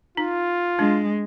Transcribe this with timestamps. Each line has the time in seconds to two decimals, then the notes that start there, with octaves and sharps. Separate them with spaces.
0.17 D#4 F4
0.79 G#3 D4